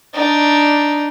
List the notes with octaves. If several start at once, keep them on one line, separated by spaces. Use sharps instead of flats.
D4 D#4